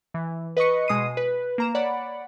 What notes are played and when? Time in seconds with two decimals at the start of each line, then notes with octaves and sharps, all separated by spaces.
0.14 E3
0.57 B4 D#5 B5 C#6 C#7
0.88 B2 G#3 D#6 C7 D#7
1.17 B4
1.58 A#3 A#5 E7
1.75 C#5 D5 F#5 B5